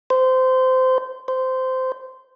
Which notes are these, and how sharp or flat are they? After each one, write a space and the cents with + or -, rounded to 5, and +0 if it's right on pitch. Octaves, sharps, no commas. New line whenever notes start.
C5 -20
C5 -15